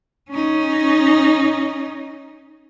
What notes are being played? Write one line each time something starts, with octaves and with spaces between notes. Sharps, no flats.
C#4 D#4